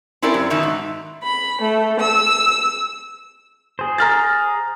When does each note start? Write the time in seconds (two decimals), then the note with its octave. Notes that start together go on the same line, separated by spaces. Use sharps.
0.22 C4 C#4 E4 G4 A#4 D5
0.34 F#2
0.50 B2 D#3 D#4 E5
0.63 G#2
1.23 B5
1.61 A3
1.99 E6
3.79 G#4 C5
3.98 A#5 F6 A6